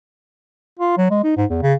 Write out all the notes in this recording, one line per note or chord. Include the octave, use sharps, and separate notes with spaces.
F4
F#3
G#3
D#4
G#2
E2
C#3